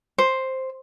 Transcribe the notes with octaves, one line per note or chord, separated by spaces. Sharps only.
C5